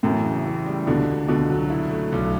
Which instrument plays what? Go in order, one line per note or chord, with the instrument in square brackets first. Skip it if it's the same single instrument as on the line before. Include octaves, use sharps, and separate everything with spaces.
[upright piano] F#2 A2 [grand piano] E3
[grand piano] C#3
E3
G3
[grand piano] C#2 [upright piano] B2 D3
[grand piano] C#2
[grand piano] C#2 [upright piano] B2 D3
[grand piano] F#3
E4
A3
B1